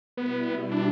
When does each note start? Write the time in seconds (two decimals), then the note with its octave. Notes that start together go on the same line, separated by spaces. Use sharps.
0.17 B2 G3 B3 E4
0.71 D4